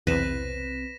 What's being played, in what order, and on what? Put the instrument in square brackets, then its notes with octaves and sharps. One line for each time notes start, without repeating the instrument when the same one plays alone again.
[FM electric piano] B1 C3 C4 [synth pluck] E2 [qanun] B4 [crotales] A#6 B6 E7